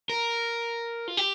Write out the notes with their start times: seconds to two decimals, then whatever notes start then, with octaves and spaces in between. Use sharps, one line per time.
0.09 A#4
1.08 F4
1.17 G4